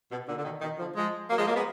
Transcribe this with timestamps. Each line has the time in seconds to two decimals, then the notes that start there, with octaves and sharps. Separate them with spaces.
0.10 B2
0.27 A#2 D3
0.37 D3
0.44 B2 D#3
0.61 B2 D#3
0.78 D3 F3
0.95 F3 G#3
1.30 F#3 A#3
1.38 F3 G#3
1.47 F#3 A#3
1.55 G#3 B3